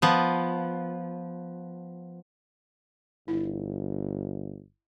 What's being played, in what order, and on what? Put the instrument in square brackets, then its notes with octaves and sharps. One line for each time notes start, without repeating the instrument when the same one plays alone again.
[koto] F3 B3
[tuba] G1 [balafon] E4